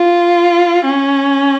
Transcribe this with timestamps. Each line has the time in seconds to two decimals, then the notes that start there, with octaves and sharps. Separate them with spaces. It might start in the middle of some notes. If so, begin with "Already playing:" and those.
Already playing: F4
0.86 C#4